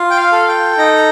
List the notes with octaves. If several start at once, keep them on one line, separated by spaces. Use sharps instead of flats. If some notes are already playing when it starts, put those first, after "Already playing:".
Already playing: F4
G5
F5
A4
G5
D#4 A#5